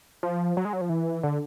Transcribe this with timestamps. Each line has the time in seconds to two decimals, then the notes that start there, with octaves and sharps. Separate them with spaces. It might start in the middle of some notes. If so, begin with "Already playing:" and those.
0.23 F3
0.57 F#3
0.65 G#3
0.73 F#3
0.81 F3
0.89 E3
1.23 D3